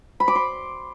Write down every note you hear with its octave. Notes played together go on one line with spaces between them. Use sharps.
B5
D6
C6